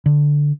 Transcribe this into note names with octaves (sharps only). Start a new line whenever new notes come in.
D3